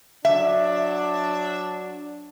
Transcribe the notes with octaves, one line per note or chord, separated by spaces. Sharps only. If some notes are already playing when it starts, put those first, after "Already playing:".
F#3 D4 E5